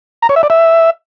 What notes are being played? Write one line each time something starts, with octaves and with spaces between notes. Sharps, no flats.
A#5
C#5
E5
D5
E5